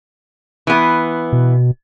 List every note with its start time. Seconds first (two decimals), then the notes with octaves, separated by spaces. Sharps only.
0.67 E3 B3
1.32 B2